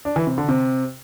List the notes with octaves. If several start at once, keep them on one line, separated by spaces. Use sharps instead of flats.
D4
E3
C3
D3
C3